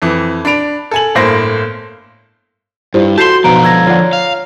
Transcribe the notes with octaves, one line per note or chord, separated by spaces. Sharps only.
F2 E3
D4 B5 D7 F7
A4 G#5 F#7
G1 A2 A#3 C5 A#6
G2 E4 F4 G4 C5
F#4 A4 A5 C6 G6 C7 E7
B1 D3 F3 B3 A#5 D7
E6 G#6 A#6
F4 C#5 D5 F#5
F5